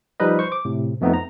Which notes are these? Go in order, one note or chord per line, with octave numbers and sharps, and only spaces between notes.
F3 G3 D#4 B4 D#5
C5 C#6
D6
A2 C3
F2 A3 B3 C4 D#4
A#5